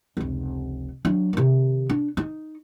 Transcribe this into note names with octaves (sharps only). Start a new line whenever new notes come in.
F1 C#2
F#3 D4
C3 D#3
D4
D#4